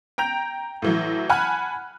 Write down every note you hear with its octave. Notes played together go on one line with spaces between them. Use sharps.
G5 A#5 G6 F7
A2 E3 F#3
F#5 G#5 A5 B5 F6 F#6